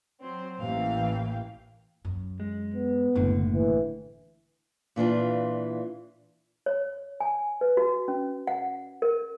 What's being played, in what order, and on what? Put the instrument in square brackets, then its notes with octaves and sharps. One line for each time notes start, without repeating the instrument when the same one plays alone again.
[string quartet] F#3 C4 C5
[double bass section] A1 E3 [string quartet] A#3 F5 G5
[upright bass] F#2
[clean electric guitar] G#3
[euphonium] B3
[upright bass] F#1 D#2 [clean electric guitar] A2 D3
[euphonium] E3
[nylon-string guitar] A#2 E3 D4 F4
[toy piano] C#5
G#5
B4
F#4
C#4
F#5
A#4